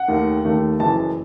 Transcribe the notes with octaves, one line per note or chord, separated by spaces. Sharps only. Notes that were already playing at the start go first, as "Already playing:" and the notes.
Already playing: F#5
D#2 D#3 A3
D#2 D#3 A3
F#1 F#2 E3 A5